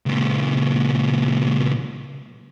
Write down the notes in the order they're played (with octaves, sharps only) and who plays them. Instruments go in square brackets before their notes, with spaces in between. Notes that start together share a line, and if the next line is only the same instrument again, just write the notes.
[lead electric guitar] C#2 A#2